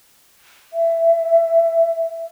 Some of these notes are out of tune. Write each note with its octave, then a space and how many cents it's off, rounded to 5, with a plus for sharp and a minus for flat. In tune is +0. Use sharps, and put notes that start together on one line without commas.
E5 +15